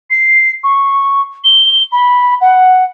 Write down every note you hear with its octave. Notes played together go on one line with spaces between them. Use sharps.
C7
C#6
G7
B5
F#5